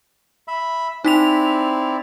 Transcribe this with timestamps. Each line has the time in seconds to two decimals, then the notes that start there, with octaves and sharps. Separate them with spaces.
0.48 E5 B5
1.05 C4 D#4 E4 D5 B6 F7